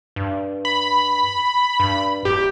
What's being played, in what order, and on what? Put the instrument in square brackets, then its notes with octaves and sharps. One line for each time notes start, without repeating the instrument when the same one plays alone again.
[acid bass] G2
[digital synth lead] B5
[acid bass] G2
[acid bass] D1 [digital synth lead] G4